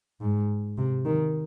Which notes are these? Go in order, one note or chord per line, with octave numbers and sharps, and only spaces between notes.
G#2
C3
D#3